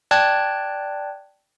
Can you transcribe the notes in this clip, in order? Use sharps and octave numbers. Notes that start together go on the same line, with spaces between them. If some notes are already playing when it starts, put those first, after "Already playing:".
D5 G5 A5 F#6 G#6